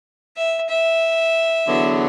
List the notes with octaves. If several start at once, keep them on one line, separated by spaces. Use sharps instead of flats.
E5
E5
E2 D3 F#3 B3